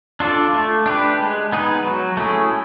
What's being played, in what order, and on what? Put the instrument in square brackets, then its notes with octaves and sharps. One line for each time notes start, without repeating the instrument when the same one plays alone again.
[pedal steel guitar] D4 F4 A4 D5
A3
D4 G4 B4
G#3
B3 D#4 G#4 B4
F#3
A3 C#4 E4 G#4